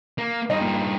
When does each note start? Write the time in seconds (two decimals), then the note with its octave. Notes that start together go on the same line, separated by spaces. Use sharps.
0.18 A#3
0.50 G2 D#4 D#5
0.61 A#2